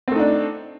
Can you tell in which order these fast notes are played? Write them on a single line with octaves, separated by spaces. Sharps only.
C4 A3 D#4 D4